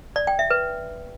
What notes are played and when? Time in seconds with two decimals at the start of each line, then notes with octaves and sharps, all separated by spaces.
0.16 D5
0.27 G5
0.39 E5
0.50 B4